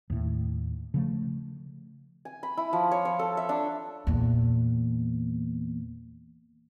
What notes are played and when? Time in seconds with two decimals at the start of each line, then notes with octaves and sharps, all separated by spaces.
0.10 D#2 A2
0.94 C#3 F3 A3
2.25 G#5
2.43 B5
2.57 E4
2.73 F3
2.91 C#5
3.05 C#5
3.19 A4
3.37 E5
3.49 D4
4.07 E2 A#2